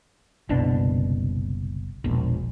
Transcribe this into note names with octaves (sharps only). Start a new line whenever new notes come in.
F#1 C2 B2 D4
E1 A#1